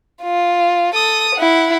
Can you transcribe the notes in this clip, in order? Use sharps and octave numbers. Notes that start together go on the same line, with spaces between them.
F4
A4 D#6
E4 F#5